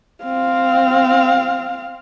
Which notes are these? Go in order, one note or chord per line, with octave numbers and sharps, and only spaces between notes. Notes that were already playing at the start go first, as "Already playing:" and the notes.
C4 F5